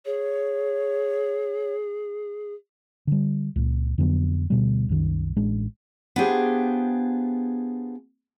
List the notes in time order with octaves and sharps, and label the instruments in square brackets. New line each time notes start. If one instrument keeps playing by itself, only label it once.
[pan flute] G#4 [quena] C#5
[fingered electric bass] D3 G3
C#2 A#2
F2 D3 F#3 B3
D2 B2 G3
C2 F#2 D#3
A1 G#3 D4
[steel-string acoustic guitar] B3 D4 F4 G4 G#4 C5